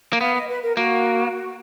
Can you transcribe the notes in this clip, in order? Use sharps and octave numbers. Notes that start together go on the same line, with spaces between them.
A#3
B3 F5
D#5
B4
A#4
A#3 F#4